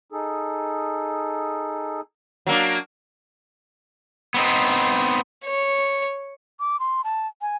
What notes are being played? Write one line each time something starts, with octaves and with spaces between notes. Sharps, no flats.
D#4 G#4 A4
F#3 A#3 D4
B3 C4 D#4
C#5
D6
C6
A5
G#5